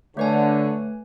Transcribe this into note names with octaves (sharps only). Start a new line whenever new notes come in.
D3 A3 B4 C#5 G#5